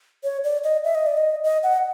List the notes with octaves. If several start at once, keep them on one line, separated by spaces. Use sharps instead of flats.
C#5
D5
D#5
E5
D#5
D5
D#5
D#5
F#5